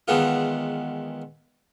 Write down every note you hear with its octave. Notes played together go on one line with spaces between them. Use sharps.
E2 D#3 G#3 B3 F4